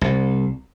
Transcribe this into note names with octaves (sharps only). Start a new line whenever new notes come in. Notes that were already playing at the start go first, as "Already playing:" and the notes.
C2